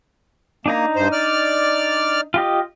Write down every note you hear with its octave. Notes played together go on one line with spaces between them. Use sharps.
A#3 D4 D#4 A#5
G2 C5
D5 F6
F4 G4 D#5